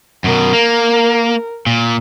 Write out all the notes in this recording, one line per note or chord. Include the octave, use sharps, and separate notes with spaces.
F#2 B2 A#4
A#3
A#2